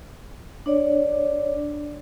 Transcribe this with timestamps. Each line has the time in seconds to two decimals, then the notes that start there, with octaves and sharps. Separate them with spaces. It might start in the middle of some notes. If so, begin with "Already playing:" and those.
0.66 D4 C#5 D5